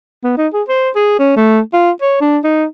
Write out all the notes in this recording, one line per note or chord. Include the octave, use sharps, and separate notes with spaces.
B3
D#4
G#4
C5
G#4
C#4
A3
F4
C#5
D4
D#4